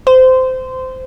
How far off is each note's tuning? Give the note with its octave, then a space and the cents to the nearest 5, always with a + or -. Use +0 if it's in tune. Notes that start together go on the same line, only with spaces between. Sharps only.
C5 -20